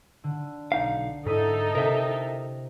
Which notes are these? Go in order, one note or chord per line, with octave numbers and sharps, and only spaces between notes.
D3
B1 D#4 F5
G#2 D#4 E4 A4 D#6 B6
C3 A#4 E5